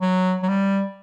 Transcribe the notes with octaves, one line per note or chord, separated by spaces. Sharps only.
F#3
F#3
G3